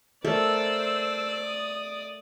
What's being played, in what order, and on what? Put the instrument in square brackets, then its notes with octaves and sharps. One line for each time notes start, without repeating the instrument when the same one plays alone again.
[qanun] A3 A4 A#4 [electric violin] C5 E6 [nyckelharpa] D5
[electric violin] D#6